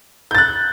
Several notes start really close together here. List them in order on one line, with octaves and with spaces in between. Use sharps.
G6 A6 F#6